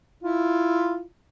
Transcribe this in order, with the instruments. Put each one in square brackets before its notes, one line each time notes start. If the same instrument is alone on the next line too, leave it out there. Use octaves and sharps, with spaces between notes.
[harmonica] E4 F4